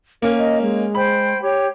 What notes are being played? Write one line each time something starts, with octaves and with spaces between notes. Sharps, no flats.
A#3 C#4 A#4
D#5
G#3
C5 G5 B5
G4 C#5